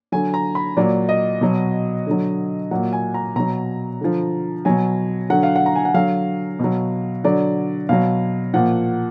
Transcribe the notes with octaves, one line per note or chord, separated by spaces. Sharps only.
D3 F#3 G#5
A#5
B5
A#2 F#3 D5
D#5
B2 F#3
D3 F#3
A#2 F#3 F#5
G#5
A#5
B2 F#3 A#5
D3 F3
B2 F#3 G#5
D3 F#3 F#5
F5
F#5
A#5
G#5
F#5
D3 F#3 F5
B2 F#3
D3 F#3 D5
B2 F#3 F5
A#2 F3 F#5